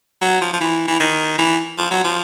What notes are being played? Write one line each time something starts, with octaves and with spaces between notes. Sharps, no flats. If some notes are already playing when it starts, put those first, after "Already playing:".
F#3
F3
F3
E3
E3
D#3
E3
F3
F#3
F3